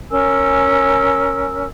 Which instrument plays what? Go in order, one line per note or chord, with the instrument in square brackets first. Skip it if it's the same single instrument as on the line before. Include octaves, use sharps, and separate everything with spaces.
[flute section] C#4 A#4 G#5 E6